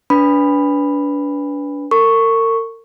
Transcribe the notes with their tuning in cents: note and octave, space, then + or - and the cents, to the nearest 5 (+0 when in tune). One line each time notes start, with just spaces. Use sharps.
D4 -30 B4 +0 B5 +0
A#4 -40 C#6 +0